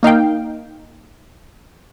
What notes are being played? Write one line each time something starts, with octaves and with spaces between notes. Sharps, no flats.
A#3 D#4 F5 G5